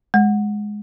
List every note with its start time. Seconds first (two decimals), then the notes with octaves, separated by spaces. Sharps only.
0.14 G#3